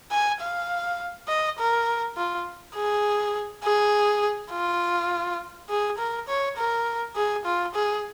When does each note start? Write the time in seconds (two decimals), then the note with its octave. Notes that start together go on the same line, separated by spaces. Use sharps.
0.12 G#5
0.41 F5
1.29 D#5
1.59 A#4
2.17 F4
2.76 G#4
3.64 G#4
4.51 F4
5.69 G#4
5.99 A#4
6.28 C#5
6.57 A#4
7.16 G#4
7.45 F4
7.75 G#4